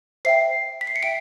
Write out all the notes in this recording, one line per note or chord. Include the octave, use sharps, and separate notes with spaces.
C5 E5 G5 C7
B6
C7
C#7
E5 G5 D7